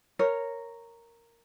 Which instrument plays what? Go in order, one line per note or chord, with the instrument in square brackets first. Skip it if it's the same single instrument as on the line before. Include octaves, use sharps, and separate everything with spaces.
[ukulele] A#4 C#5